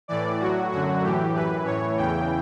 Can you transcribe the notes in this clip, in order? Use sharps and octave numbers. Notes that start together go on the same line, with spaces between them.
A2 E3 D5
A2 F#3 F#4
F#2 D3 F#3 F#4
A2 E3 G4
F#2 E3 B4
A2 E3 C#5
E2 C#3 E3 G5